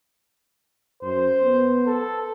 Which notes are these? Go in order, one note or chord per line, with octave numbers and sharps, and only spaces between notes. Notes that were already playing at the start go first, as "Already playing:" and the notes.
F#2 C5
B3
A4